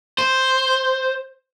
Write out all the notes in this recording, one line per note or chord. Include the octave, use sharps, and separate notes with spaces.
C5